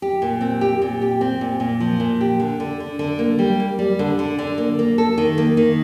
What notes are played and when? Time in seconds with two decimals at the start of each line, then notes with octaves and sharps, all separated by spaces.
0.02 G4
0.22 A#2
0.41 C4
0.61 G4
0.82 A#2
1.02 G4
1.21 C4
1.41 A#2
1.60 A#2
1.80 F3
2.00 A#2
2.21 G4
2.40 D3
2.60 D3
2.80 D3
2.99 D3
3.19 A#3
3.39 G3
3.60 A#3
3.79 G3
3.99 D3
4.19 D3
4.39 D3
4.58 A#3
4.79 A#3
4.98 A4
5.18 D#3
5.38 A#3
5.57 D#3